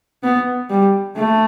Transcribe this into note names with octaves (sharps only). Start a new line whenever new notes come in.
B3
G3
A3